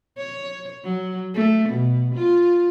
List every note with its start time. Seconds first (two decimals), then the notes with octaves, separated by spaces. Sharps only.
0.17 C#5
0.84 F#3
1.34 A3
1.69 B2
2.15 F4